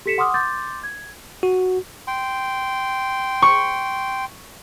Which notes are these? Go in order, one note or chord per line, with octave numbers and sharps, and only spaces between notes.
G4 A4 B6 C#7 E7
F#5 C6 D6 D#6 F6
C6 D6 G6 A6
G#6
F#4
G5 C6
C#6